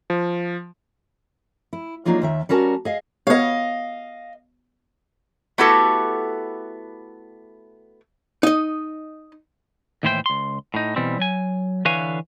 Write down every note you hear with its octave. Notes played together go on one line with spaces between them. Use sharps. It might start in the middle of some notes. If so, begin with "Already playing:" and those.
F3
E4
F#3 A#3 D4 D#4 F4 G#4
D#2 D#3 E5
G3 C#4 F#4 A#4 A5
G#4 D#5 F5
B3 C#5 D#5 F5
A3 B3 E4 F#4 G4 A4
D#4 D#5
D#2 A2 E3 E4 C5 G5
C#2 C6
A2 D#4
B2 E3 G3 C4
F#3 G#5
D3 E3 B4 C#5 F5 G#5